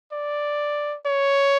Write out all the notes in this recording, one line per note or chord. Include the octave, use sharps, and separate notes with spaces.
D5
C#5